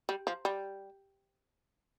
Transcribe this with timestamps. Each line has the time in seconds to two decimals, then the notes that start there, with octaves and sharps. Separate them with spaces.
0.09 G3
0.27 F3
0.45 G3